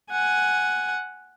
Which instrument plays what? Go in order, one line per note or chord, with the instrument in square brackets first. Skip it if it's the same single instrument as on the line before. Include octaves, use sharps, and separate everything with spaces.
[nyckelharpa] F#5 G#5